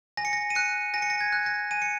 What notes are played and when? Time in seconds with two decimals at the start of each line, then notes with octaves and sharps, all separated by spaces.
0.17 G#5 A#6
0.25 C#7
0.33 A#6
0.50 D#7
0.55 F#6 C#7
0.94 G#5 A#6
1.02 C#7
1.10 A#6
1.21 G#6
1.33 F#6
1.46 A#6
1.71 G#5 D#7
1.82 C#7